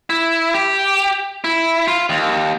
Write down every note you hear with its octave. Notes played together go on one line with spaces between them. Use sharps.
E4
G4
E4
F4
D#2